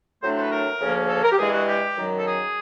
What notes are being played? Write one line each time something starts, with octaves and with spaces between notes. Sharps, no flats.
A2 F#3 A3 D4 C5
C5
B4
A#4
D2 C#3 F3 A#3 C#4
A4
A#4
G4
G2 E3 G#3 G#4
F#4
G4
F#2 D#3 F#3
A4
G#4